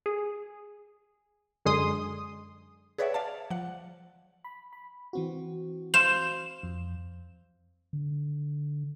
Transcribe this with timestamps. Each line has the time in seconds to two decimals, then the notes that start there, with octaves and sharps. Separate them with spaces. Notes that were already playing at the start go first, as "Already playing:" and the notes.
0.06 G#4
1.65 F#2 D3 G#3 G#4 C6 D#6
2.98 G#4 B4 C#5 D5 E5 F#5
3.14 D5 F5 A5
3.51 F3 F#5
4.44 B5
4.73 B5
5.13 E3 C4 F#4
5.94 C5 F5 E7
6.63 F2
7.93 D3